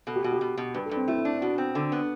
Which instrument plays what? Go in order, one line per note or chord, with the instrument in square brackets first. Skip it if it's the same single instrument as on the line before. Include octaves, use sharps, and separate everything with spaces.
[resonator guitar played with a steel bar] B2 [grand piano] A4
[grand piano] G4
[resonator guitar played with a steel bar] B2 [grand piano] F#4
[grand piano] G4
[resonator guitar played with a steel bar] B2
B2
[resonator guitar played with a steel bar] G2 [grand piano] B4
[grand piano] A4
[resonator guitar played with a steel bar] G2
[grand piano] C4
[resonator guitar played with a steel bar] A3 [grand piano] E4
[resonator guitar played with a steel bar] D4
[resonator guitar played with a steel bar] B2 [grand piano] F#4
[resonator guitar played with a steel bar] C4
D3
B3